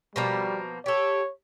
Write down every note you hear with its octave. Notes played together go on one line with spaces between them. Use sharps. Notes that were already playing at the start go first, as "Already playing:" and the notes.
B2 F3 G3 A#3
G4 A4 C#5